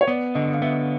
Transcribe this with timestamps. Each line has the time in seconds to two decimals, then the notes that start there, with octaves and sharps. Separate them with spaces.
0.01 C#5
0.08 B3 D5
0.35 D3 D#5
0.53 F5
0.62 B3 E5